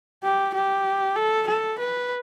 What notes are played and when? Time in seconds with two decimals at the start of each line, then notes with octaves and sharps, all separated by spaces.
0.23 G4
0.54 G4
1.16 A4
1.48 A4
1.79 B4